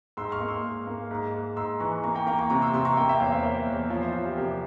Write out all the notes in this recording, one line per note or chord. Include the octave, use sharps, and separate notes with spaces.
G#2 C6 E6
C#6 F6
A#3
C6 E6
G#2
A#3
G#2
G#2
G#2 C6 E6
E3 A#5 C#6
A#3 A#5 C#6
G5 A#5
A#3 G5 A#5
A#5 C#6
C3 A#5 C#6
C6 E6
C3 C6 E6
A#5 C#6
A#3 G5 A#5
E5 G5
E2 C#5 F5
C5 E5
A#3 A#4 C#5
E2
F3 C#5 F5
C5 E5
F3 F4
G4
C3 G4 A#4